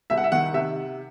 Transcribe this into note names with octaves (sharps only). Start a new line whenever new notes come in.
C2 E5
F#5
E5
D#3 F#5
C3 E5